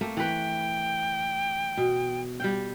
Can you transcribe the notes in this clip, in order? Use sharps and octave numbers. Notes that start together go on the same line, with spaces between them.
A3 A#3 C4
E3 B4 G5
B2
G3 F5 G5